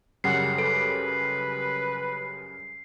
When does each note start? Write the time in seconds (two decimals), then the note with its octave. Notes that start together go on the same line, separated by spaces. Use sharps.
0.24 F#2 C#3 G3 F#5 C7
0.58 A4 B4